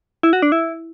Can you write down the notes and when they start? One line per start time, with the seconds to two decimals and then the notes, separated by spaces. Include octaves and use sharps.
0.23 E4
0.33 F#4
0.42 D4
0.52 E4